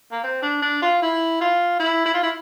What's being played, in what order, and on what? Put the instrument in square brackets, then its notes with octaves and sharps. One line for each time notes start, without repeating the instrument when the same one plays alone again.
[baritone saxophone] A#3
C4
D4
D4
F4
E4
F4
E4
E4
F4
E4